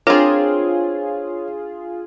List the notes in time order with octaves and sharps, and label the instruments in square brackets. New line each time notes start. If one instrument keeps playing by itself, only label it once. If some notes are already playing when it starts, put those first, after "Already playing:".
[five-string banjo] C4 A#4 [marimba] D4 [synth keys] F4 G#4 [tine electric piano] C#5